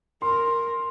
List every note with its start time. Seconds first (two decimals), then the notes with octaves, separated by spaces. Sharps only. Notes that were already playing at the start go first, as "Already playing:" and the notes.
0.22 A#4 C6